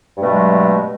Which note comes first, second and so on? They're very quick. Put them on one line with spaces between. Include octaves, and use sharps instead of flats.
G2 A3 B2 F#3 G#3